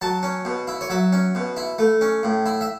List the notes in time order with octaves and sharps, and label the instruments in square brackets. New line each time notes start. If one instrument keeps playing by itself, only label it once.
[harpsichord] F#3 A5
C#4
B2
E4
C#5
F#3 E5
C#4
B2
E4
A3
C#4
A2
E4
E5